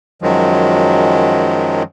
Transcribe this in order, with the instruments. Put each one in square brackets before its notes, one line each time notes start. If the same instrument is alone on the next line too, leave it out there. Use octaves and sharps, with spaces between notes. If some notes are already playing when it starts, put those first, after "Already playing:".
[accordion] F#2 D#3 F3 F#3 G#3